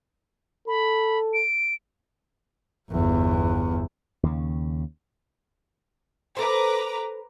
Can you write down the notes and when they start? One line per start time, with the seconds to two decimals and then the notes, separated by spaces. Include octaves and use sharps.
0.68 A4 B5
1.34 D7
2.91 G1 E2
4.23 D#2 C#3
6.37 A4 B4 C5 A#5 D6